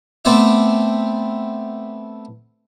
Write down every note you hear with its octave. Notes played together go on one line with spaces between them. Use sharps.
A3 B3 C4 C5 D5 E5